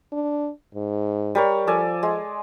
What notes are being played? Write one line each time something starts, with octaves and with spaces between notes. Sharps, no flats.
D4
G#2
G3 A#4 C#5
F3 A4 D5 G#5
G#3